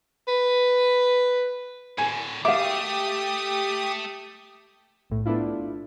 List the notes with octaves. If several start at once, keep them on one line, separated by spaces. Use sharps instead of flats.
B4
A2 D3 G#5
A3 G4 E5 F5 D6 D#6
B1 A2
A3 B3 D4 E4 F4